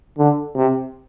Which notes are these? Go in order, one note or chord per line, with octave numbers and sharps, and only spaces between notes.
D3
C3